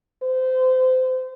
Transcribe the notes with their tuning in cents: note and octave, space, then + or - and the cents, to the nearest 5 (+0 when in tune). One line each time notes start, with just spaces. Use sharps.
C5 -25